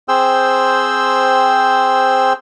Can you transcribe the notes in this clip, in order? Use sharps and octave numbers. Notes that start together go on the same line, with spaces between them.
C4 G#4 C5 G5 E6